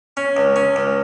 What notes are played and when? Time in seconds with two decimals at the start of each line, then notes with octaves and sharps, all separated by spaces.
0.17 C#4
0.37 C#2
0.56 C#4
0.76 C#2